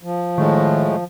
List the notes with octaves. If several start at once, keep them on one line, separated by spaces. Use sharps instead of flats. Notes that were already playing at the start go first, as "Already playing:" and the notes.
F3
A2 D#3 G#3 A3